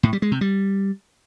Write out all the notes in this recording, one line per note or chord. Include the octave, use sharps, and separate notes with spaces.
A2
G3
G#3
C3
G3